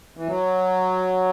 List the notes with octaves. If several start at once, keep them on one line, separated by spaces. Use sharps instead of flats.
E3
F#3